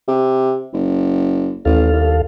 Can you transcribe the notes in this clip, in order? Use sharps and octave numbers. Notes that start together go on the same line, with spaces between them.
C3
F#1
A1 D#2 A4 F5
C2